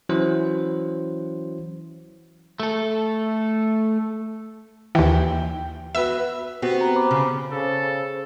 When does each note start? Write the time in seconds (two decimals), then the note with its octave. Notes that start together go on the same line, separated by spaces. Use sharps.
0.09 E3 F#3 C#4 E4 F#4 C5
2.60 A3 A4
4.95 D#2 E3 G5
5.95 B3 F#4 B4 E5 E6
6.62 B3 C4 F#4 G4
6.81 A#5
6.96 C5 B5 D6
7.11 C#3
7.52 C#3 A4 C5